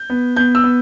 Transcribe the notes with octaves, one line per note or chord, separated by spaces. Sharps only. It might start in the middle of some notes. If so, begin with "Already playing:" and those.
Already playing: G6
B3
B3 G6
E6
B3